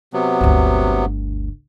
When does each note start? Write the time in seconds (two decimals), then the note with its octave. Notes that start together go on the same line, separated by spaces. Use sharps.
0.13 C3 F#3 B3
0.41 G1 D2